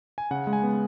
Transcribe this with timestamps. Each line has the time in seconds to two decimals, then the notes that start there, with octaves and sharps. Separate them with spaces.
0.18 G#5
0.31 C#3 F#5
0.47 G#3
0.53 G#5
0.63 B3